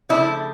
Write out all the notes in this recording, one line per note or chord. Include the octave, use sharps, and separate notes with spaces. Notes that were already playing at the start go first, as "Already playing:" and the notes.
C#3 F3 A3 D4 E4